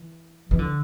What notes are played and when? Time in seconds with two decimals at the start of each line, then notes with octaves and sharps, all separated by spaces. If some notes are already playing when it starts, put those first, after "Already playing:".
Already playing: E3
0.51 E3
0.59 D3